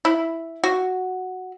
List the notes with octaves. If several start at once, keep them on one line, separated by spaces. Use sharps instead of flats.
E4
F#4